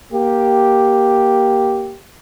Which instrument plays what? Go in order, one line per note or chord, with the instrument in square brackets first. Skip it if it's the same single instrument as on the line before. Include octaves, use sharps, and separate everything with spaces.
[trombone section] A#3 G4